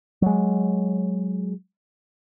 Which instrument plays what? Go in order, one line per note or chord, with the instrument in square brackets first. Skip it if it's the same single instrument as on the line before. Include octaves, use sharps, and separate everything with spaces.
[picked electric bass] F#3 G#3